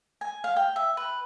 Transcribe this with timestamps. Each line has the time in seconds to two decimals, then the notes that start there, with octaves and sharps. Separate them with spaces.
0.21 G#5
0.44 F5
0.56 G5
0.76 E5
0.97 B4